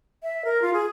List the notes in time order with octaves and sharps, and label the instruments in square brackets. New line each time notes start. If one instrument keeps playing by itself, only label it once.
[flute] E5
A#4
F4
G#4